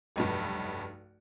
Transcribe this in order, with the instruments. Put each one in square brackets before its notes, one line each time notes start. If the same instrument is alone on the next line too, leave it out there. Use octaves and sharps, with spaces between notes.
[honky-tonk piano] F1 B1 G2